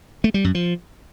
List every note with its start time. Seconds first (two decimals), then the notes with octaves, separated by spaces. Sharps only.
0.24 A3
0.34 G3
0.44 F#2
0.55 F3